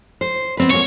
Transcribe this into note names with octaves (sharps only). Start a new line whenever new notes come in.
C5
B3 C4 B4
G#2 F#3 A#3 C#5